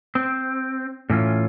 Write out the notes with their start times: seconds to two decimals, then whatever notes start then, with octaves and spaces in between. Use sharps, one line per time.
0.15 C4
1.10 A2 E3 C#4 F4